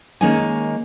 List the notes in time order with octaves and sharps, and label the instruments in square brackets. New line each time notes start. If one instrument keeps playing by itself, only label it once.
[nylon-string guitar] D#3 G#3 A#3 C#4 D#4 G#5